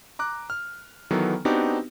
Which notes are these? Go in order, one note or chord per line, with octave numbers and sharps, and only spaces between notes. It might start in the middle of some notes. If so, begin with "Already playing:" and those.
A#5 D6 F#6
F6
D#3 E3 F#3 B3 A4
B3 C4 D4 D#4 F#4 G4